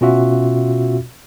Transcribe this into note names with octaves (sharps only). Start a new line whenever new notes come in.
B2 C#4 F4 F#4 E5